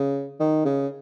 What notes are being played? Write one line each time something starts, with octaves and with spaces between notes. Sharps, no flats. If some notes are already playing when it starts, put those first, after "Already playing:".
Already playing: C#3
D#3
C#3